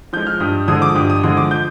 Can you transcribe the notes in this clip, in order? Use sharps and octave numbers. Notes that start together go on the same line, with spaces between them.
F3 G#3 G6
F6
G2 D#6
D3 F3 G#3 D#6
D6
G2 D#6
D#6
D3 F3 G#3 D#6
D6
G6